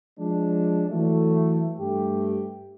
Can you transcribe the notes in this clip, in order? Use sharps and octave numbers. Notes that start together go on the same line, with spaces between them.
F3 G#3 D4
E3 F#3 A3
G2 A3 G4